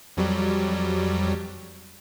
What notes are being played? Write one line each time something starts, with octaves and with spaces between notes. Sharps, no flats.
F2 F#3 G3